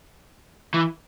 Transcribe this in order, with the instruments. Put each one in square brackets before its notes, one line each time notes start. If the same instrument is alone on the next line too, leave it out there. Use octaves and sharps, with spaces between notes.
[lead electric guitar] E3